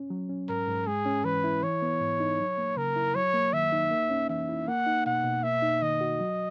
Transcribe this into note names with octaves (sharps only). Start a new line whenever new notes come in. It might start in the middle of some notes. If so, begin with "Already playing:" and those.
Already playing: C#4
F#3
C#4
G#2 A#4
G#2
G#3 G#4
C#4
E3 B4
E4
E3 C#5
B3
G#2
D#4
F#3
A#3
C#3 A#4
E4
F#3 C#5
A#3
D#3 E5
D#4
A#3
C#4
E3 E5
E4
A#3 F#5
D#4
B2 F#5
B2
A#3 E5
D#4
D#3 D#5
F#4
F#3